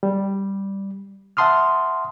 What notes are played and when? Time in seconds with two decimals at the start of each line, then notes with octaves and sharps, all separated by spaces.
0.03 G3
1.37 E5 F#5 A5 C6 D#6 F6